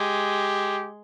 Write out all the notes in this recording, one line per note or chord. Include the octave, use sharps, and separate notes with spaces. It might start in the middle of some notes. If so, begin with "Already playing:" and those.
Already playing: G#3 G4